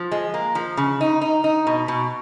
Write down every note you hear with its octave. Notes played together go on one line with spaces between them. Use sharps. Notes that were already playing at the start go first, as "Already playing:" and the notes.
Already playing: F3
G#3
A#3
F3
C#3
D#4
D#4
D#4
B2
B2